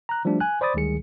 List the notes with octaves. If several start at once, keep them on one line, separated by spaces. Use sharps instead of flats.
A#5 F#6
F3 G3 A3 D4 F#4
G#5 F#6
C5 D5 B5 D6 D#6 A6
D2 D#3 G3 G#3 G#4 C#7